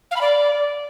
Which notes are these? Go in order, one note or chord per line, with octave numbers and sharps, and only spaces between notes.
F5
B5
D5